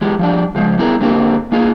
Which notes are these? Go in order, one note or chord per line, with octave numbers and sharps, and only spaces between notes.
E3 G#3 G4
F3 G3 D4
C#3 F3 G3 G#3
G3 B3 E4 G#4 A#4
D3 A#3 C4 G4 A#4
A#3 D#4 F4 G#4